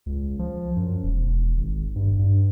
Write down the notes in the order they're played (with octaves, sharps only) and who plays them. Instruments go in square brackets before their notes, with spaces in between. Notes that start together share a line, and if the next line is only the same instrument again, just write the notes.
[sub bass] C#2
F3
F#2
E1
G#1
G2
G2